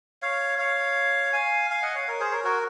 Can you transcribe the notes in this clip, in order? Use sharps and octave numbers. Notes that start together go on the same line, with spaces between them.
C#5 F5
C#5 F5
F5 G#5
F5 G#5
D#5 F#5
C#5 F5
A#4 C#5
G#4 C5
A#4 C#5
F#4 A#4